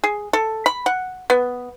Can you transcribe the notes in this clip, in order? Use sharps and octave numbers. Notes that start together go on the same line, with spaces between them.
G#4
A4
B5
F#5
B3